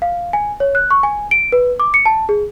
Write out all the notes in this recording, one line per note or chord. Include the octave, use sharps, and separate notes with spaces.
F5
G#5
C#5
F#6
C#6
G#5
D7
B4
D6
C#7
A5
G#4